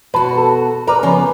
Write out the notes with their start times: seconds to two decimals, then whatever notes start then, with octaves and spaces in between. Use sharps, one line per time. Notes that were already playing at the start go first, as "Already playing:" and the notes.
0.14 B2 F#4 B4 A5
0.38 A4
0.87 A#4 B4 D5 A#5
1.03 C#3 F3 B3 C#4 B4